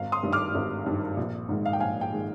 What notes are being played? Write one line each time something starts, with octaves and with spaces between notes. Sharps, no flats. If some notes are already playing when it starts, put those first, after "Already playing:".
Already playing: G#1 F5
C6 D#6
G2 D#3
D6 F6
G#1
G2 D#3
A#1
G#2 D#3 G#3
F5
G5
A#1 F5 G#5
G5
D#3 G#3